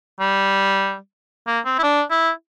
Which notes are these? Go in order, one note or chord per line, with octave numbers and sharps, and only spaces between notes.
G3
A#3
C4
E4
D4
E4